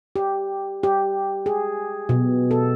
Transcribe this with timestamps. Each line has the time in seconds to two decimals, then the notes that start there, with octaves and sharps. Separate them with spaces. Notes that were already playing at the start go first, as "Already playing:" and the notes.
0.16 G4
0.83 G4
1.46 G#4
2.09 B2
2.51 A4